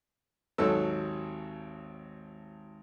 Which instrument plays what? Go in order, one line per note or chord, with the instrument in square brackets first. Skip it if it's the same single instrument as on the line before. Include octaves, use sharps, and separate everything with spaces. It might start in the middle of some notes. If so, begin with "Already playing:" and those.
[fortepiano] G#1 D#2 F#3 A4 E6